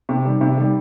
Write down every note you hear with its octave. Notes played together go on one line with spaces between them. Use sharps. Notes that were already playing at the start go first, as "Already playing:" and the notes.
C3
D#3 G3
C3
D#3 G3